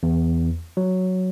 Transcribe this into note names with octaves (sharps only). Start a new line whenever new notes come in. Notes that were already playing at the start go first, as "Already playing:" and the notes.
E2
F#3